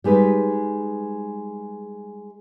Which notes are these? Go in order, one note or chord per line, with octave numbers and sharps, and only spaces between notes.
G3 G#3 D#4 B4